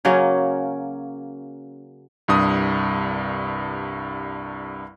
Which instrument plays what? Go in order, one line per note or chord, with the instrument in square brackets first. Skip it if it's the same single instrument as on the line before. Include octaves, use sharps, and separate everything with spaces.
[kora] C#3 F#3 A#3 C#4
[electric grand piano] C2 G2 D#6